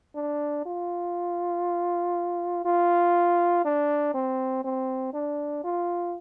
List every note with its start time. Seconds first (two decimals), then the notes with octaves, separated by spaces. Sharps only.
0.16 D4
0.66 F4
2.65 F4
3.65 D4
4.14 C4
4.64 C4
5.14 D4
5.64 F4